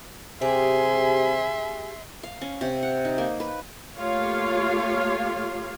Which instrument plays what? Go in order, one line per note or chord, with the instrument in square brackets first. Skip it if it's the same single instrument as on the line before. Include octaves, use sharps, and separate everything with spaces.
[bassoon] C3 [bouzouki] G4 G#4 [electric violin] E5 C6 [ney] G#5
[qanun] F5
C#4
C3
F#5
D#4
A#3
B4
[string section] A3 A#3 F4 G4 C#5 F5